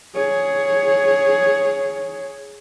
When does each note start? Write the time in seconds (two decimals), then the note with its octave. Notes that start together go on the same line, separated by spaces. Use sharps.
0.15 G#4 C#5